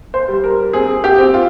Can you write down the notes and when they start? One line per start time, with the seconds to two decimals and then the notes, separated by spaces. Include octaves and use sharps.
0.14 C5
0.28 G3
0.44 A#4
0.73 C4 G#4
1.04 G4
1.18 C4
1.34 F4